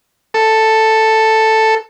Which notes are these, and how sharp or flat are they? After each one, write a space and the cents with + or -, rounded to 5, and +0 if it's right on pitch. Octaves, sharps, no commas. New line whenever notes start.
A4 +5